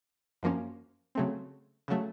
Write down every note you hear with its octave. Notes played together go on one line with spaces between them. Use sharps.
F#2 F3 A#3 C#4
C#3 F#3 A3 C4
C#3 F#3 A3